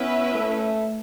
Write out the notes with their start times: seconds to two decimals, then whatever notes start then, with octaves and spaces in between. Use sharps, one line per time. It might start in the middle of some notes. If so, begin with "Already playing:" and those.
Already playing: B3 C#4 E4 B4 E5
0.35 A3